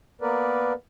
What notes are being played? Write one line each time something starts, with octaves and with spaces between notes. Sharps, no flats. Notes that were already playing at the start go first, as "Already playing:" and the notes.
A#3 B3 A#4 B4 D5